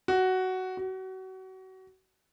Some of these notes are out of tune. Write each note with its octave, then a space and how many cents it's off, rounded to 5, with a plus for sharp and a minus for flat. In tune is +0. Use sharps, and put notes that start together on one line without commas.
F#4 +10
F#4 +30